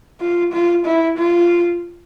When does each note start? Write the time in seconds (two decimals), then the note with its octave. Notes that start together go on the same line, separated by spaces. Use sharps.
0.20 F4
0.52 F4
0.85 E4
1.17 F4